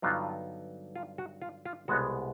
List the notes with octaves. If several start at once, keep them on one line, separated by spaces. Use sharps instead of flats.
G2 D3 F#3 B3 D#4 F4
F4
F#4
F4
F4
C2 B2 G#3 B3 F#4